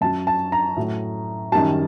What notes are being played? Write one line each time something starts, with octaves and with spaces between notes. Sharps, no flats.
F#2 F#3 A5
A5
A#5
A2 F#3
F#2 D#3 G3 A5